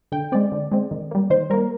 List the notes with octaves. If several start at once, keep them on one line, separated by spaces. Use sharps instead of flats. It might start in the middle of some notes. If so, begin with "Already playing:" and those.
D3 G5
G#3 C4 D5
D3
G#3 C4
D#3
G3 A#3
D#3 C5
G3 A#3 A#4